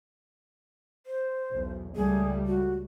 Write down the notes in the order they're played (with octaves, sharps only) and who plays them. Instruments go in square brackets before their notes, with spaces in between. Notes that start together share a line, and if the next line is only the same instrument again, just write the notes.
[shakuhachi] C5
[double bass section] B1 E2
[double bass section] C#2 G3 A3 [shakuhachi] G#4
[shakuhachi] F#4